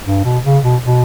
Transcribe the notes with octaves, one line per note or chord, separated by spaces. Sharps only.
G2
B2
C#3
B2
B2